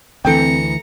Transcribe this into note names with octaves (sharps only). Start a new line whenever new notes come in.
D2 E3 C4 A4 G5 A#5 C#7